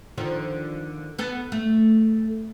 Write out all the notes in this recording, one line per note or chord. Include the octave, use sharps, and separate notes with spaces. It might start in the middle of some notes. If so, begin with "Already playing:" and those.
D3 D#3 F3
B3 A4
A3